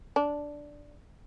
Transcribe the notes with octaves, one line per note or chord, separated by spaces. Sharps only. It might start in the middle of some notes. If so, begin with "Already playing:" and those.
D4